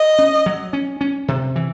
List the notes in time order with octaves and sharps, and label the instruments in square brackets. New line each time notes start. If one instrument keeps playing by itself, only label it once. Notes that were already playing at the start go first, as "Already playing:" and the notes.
Already playing: [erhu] D#5
[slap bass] C#4
F#3
C#4
C#4
C3
E3